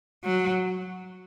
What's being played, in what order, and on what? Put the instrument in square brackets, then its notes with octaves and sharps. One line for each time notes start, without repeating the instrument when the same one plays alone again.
[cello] F#3